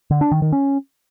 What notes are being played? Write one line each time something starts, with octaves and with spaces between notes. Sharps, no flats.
D3
D4
D#3
D#3
C#4